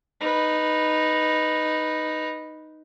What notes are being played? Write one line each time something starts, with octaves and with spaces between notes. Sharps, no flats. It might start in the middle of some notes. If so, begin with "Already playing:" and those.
D#4 B4